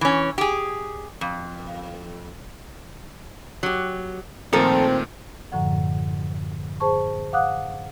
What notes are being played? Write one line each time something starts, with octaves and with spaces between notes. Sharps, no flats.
E3 C#4
G4 G#4
F2
F#3 G4
A#2 D#3 F3 A3 C4 A4 A#4
F#2 A2 D3 F3 F#5
G#4 C5 A5 C#6
F5 F#5 D6 D#6 F#6